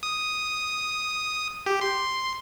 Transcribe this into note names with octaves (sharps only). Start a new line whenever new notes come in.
D#6
G4
C6